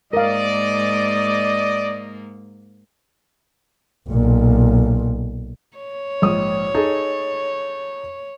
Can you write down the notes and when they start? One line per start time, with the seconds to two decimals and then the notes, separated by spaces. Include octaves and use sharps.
0.13 G#2 A#3 A#4 D5 D#5 F5
4.09 B1 A#2
5.78 C#5
6.22 A#1 G#2 D#6
6.74 D#4 G#4 A4